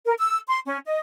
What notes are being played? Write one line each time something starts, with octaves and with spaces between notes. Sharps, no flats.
A#4
E6
C6
C#4
D#5